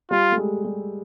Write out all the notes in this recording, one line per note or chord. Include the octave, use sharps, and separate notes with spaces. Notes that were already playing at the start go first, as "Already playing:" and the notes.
G3 F4
A3
G#3
G3